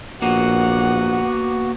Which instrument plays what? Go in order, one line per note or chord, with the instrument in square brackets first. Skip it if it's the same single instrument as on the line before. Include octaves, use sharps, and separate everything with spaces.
[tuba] A#1 [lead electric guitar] A#3 B3 [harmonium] F#4 [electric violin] F#5